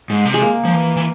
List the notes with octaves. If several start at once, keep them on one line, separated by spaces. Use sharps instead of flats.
G#2
C3
G#3
A#3
F3
E3
E3